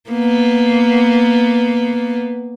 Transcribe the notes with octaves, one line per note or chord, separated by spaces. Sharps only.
A#3 B3